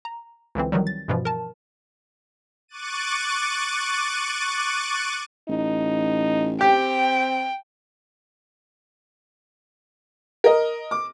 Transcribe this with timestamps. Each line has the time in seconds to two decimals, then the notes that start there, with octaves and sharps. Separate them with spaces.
0.05 A#5
0.55 C#2 D3 E3 C4
0.72 D#3 E3 F#3 G3
0.87 A6
1.08 G2 B2 E3 F3
1.25 A#4 A5
2.68 C#6 D6 F#6 A6 D#7
5.49 A1 D#4
6.61 C4 G4 G5
10.44 A#4 D#5
10.91 D6